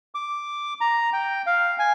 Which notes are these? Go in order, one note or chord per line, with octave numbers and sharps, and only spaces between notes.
D6
A#5
G5
F5
G#5